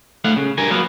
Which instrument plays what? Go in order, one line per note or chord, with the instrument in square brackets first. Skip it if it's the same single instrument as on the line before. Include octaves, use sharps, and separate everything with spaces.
[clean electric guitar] A2 A3 F5 F#5
C#3
G2 A#4 G#5
F#3 A#3 B3 F5